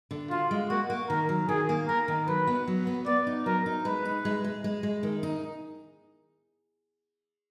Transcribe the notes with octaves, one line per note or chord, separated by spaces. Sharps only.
D3
F4 F#4
G#3
A#3 F#4
A#3
D#3 A#4
F#3
D#3 G#4
A#3
A#3 A#4
D#3
F#3 B4
B3
F#3
B3
B3 D5
D#4
F#3 A#4
D#4
G#3 B4
D#4
G#3
G#3
G#3
G#3
D#3
D#4